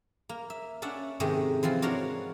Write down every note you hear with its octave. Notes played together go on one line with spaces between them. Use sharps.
A#3
E5
C#4 D4 D5 E5 F#5
G#2 C3 D#3 G#3 A3 G4
E3 F3 C4 F4
D4 F#4 A#4 C#5 F5 F#5